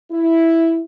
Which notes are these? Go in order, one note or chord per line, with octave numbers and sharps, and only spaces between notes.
E4